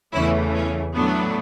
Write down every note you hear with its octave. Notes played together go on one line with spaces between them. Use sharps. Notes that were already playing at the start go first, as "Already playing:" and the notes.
E2 C#3 E3 A3 C#4 E4
C#4
A2 F#3 A3 B3 D4